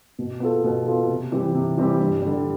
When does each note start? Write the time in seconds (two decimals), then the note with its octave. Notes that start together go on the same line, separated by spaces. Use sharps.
0.19 B2
0.40 B3 F4 A4
0.64 B2
0.86 B3 F4 A4
1.08 C3
1.32 E3 G3 C4 G4
1.55 C3
1.77 E3 G3 C4 G4
2.00 G2
2.22 D3 G3